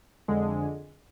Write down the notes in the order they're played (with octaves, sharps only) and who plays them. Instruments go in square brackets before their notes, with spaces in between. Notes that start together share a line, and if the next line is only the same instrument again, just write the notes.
[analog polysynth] F2 D3 G#3